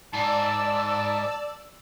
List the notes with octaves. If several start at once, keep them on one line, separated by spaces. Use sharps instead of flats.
G#2 D5 A5 E6